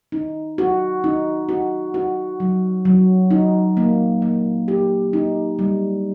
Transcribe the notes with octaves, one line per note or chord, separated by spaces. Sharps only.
D#4
F#4
D#4
F#4
F#4
F#3
F#3
D#4
A#3
A#3
G4
D#4
G3